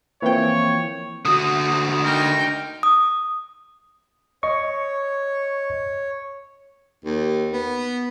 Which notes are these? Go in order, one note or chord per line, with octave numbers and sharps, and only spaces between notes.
E3 F3 A#3 C4 C#5 G5
D3 F#4 D#6
D#4 A#4 G5
D#6
C#5 D#5 C#6
D#2
B3